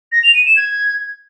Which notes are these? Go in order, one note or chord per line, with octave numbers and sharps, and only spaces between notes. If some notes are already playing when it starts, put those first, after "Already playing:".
A#6
F7
D#7
E7
G#6